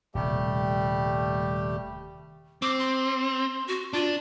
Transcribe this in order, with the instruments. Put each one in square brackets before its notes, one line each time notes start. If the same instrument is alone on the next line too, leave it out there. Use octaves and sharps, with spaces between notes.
[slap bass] D#1 C3 [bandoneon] G3 A3 G4
[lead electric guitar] C4 [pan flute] D6
[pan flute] C6
F#4
[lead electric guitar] D4 [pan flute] F4